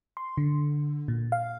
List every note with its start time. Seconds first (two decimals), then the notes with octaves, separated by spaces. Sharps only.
0.17 C6
0.37 D3
1.08 A#2
1.32 F5